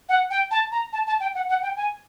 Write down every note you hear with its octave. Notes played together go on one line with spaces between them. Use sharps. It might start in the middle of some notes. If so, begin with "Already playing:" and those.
F#5
G5
A5
A#5
A5
A5
G5
F#5
F#5
G5
G#5